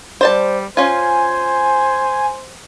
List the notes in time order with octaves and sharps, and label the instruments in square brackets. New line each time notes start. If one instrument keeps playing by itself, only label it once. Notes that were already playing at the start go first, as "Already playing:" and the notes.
[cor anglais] G3 [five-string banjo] C5 D5 A5
[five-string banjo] C#4 F4 [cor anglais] C5 [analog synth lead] G#5